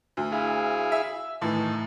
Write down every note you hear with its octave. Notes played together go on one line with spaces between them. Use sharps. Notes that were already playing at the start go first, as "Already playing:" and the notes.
D2
E4 G#4 F5
E5
A2 D#3 E3 A5